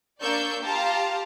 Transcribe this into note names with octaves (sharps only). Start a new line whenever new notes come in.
A#3 D4 D5 C#6 E6 G6
F4 G4 F5 A5 A#5